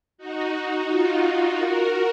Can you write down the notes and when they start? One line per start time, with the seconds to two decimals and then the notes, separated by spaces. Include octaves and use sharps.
0.18 D#4 F#4
0.88 F4
1.22 D#4 F#4
1.57 F#4 A#4